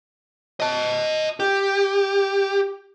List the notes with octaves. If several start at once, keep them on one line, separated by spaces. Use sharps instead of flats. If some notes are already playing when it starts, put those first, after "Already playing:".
D#5 A5
G4